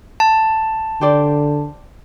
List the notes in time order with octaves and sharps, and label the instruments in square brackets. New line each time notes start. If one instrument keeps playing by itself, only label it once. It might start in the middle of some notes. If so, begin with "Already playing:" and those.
[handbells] A5
[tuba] D3 [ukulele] G4 C5 D5